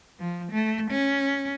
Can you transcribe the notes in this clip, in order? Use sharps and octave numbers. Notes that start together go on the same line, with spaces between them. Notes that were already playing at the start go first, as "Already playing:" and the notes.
F3
A3
C#4